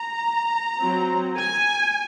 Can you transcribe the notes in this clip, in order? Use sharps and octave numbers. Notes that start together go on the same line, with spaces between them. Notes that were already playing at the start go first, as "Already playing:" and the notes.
Already playing: A#5
F#3 C4
G#5